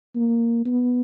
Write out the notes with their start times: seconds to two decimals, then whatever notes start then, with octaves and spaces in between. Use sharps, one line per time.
0.16 A#3
0.66 B3